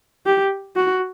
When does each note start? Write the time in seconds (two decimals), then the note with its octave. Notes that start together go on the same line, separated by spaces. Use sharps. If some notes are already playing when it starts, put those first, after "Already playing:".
0.26 G4
0.76 F#4